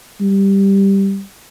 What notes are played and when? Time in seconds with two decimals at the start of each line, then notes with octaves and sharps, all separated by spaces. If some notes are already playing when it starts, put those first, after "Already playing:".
0.21 G3